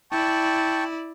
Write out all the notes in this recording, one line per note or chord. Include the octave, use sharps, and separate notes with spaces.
E4 D5 G5 A5 C#6